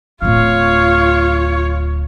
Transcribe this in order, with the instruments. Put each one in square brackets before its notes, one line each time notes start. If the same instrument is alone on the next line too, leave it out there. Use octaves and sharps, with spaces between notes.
[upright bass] D1 D3 [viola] F4 C#5 [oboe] F5